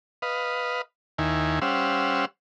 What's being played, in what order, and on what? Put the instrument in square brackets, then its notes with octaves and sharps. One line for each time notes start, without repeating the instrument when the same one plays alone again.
[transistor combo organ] B4 D#5 F5
D#2 D#3 E4 G#5
G3 C#4 C5 F5 F#5 E6